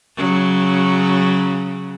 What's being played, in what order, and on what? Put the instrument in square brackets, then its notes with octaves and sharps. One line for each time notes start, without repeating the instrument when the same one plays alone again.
[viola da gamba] C#3 F#3